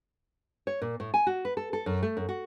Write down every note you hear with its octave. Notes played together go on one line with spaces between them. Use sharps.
C#5
A#2
A2
G#5
F#4
B4
A4
A4
F#2
A3
F#2
F#4